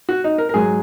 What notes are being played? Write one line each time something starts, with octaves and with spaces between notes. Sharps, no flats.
F#4
D#4
A#4
A#4
G#2 F#3 G#4